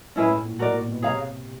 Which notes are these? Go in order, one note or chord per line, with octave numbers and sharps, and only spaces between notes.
A2 C#4 E4 G#4 B4
A2
A#2
A2 F#4 A#4 D5
A#2
B2
C3 G#4 C#5 F5 A#5